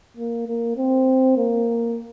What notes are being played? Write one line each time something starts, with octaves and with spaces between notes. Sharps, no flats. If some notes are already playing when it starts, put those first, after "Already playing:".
A#3
A#3
C4
A#3